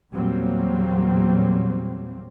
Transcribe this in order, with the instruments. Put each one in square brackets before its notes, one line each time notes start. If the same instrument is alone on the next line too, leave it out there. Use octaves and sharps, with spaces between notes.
[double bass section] E2 A#2 F#3 G3 A#3 C4